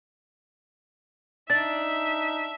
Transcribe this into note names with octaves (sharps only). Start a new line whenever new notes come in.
D4 D#4 E5 A6